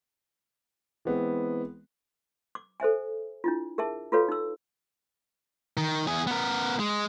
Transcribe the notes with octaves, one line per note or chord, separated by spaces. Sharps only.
E3 G#3 B3 C4
D6
A4 C5 E5 G#5
D4 E4 F4
G#4 A#4 E5 A5
F4 F#4 A4 B4 C#5 F5
D#4 E6
D#3
E2 G#4
B3 A#4
G#3